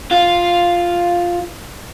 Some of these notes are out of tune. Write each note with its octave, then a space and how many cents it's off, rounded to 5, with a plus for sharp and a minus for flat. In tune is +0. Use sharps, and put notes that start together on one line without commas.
F4 +5 F5 +0